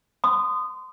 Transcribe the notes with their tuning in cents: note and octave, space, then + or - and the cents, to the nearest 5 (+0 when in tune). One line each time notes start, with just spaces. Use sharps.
C6 -30 D#6 -15